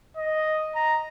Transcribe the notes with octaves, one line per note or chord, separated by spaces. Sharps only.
D#5
A#5